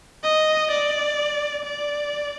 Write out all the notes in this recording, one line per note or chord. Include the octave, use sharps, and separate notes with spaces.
D#5
D5
D5